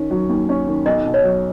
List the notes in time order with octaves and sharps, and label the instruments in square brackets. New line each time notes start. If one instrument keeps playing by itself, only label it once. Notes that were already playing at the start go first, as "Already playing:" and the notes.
Already playing: [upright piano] D#3 C#4
F#3
D#2
C#4
D#3
[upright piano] B1 [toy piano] D#5
[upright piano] B2
[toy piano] C#5
[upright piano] F#3